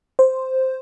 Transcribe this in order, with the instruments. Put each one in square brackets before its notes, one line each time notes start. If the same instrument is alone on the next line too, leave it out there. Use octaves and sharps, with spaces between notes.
[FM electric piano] C5